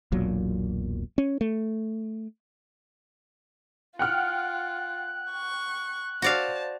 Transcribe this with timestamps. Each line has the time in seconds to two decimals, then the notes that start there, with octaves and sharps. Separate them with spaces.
0.12 E1 B1 A#2 F#3
1.18 C#4
1.41 A3
3.99 F4 F#5 G5 F6 F#6
5.32 C#6
6.22 F#4 C5 D5 F5 A5